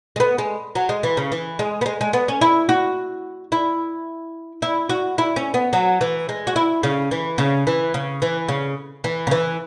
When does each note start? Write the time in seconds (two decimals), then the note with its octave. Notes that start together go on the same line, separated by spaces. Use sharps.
0.16 G#3
0.20 B3
0.38 G#3
0.75 F#3
0.89 G#3
1.03 E3
1.17 C#3
1.32 E3
1.59 G#3
1.81 B3
1.86 G#3
2.01 G#3
2.13 B3
2.28 C#4
2.41 E4
2.69 F#4
3.52 E4
4.62 E4
4.89 F#4
5.18 E4
5.36 C#4
5.54 B3
5.73 F#3
6.01 E3
6.29 G#3
6.47 F#4
6.56 E4
6.83 C#3
7.11 E3
7.38 C#3
7.67 E3
7.94 C#3
8.22 E3
8.48 C#3
9.04 E3
9.27 C#3
9.31 E3